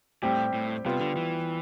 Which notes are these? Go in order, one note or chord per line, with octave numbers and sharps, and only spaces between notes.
A2 G3 C4 G4
A2
C3 G3 B3 F4
D3
E3